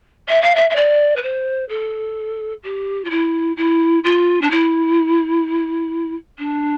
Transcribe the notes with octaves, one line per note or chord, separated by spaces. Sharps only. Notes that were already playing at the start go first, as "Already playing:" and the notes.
E5
F5
E5
E5
D5
B4
C5
A4
G4
F4
E4
E4
F4
D4
E4
D4